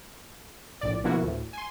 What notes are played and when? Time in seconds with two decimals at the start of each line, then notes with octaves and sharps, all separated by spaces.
0.81 A#1 A2 D5
1.04 B2 D3 F3 A#3 E4 F#4
1.23 D2 A2
1.53 G#5 C6